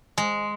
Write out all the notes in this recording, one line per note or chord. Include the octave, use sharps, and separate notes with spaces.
G#3